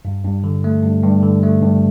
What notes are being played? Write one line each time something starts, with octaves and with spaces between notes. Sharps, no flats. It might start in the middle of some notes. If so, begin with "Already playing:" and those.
G2
G2
D3
A3
G2
G2
D3
A3
G2